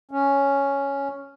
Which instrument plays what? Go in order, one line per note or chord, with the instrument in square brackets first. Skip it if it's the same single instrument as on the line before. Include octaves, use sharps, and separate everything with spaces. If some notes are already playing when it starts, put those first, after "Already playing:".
[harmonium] C#4